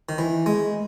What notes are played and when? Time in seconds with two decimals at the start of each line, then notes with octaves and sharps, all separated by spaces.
0.09 D#3
0.18 E3
0.46 G#3